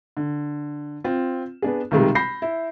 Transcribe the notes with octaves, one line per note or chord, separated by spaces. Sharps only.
D3
C4 F4
B3 D4 G#4
B1 C3 D#3 G3 G#3
B5 G6 A#6 C7
E4